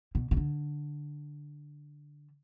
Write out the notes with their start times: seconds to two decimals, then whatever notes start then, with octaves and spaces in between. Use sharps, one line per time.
0.15 B2
0.31 B2
0.37 D3